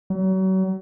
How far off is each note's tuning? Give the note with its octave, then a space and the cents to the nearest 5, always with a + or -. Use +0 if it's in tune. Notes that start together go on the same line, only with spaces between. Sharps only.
F#3 +35